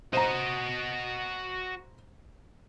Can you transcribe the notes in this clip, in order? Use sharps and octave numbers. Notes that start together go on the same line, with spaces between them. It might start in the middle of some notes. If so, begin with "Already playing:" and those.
F#4 C5 D#5 A#5